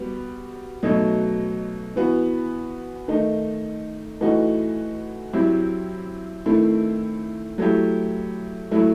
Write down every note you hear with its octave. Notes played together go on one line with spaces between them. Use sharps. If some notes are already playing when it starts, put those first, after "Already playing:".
Already playing: G3 B3 F#4
B2 F#3 A3 D#4
E3 B3 F#4
D#3 A3 D#4
E3 A3 D#4 F#4
F#3 C4 E4 G4
D#3 A3 C4 E4
F#3 A3 E4 G4
F#3 A3 E4